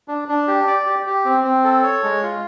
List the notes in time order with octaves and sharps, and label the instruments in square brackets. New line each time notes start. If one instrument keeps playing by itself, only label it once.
[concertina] D4
D4
G4
D5
G4
G4
C4
C4
A4
C#5
G#3
F4